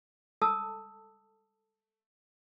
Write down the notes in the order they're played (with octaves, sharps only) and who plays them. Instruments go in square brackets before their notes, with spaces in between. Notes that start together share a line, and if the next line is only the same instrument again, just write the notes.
[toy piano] A4 A5 D#6 E6